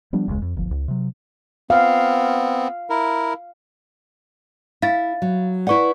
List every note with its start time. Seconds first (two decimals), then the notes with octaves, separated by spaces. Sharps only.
0.13 F3 G3 B3 D4
0.28 E1 C#2 C#3 G#3
0.42 F2
0.55 D1 G1 F3
0.71 C#2
0.88 C3 F#3
1.70 B3 C4 F5
2.90 E4 A#4
4.82 E4 F5 A6
5.22 F#3
5.67 E4 B4 D5 F#5 C#6